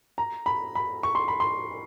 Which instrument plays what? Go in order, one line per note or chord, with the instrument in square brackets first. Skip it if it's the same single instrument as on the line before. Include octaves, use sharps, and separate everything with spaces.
[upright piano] A#5
B5
B5
C#6
C6
B5
C6